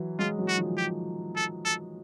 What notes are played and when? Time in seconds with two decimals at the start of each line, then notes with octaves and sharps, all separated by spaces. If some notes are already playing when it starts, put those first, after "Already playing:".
Already playing: E3 F#3
0.19 F#3 G#3 F4
0.38 E3 F#3
0.48 F#4
0.57 D#3 F3
0.77 G4
1.36 A4
1.65 A4